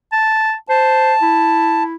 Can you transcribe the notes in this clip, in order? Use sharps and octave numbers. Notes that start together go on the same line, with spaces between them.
A5
C5 A5
E4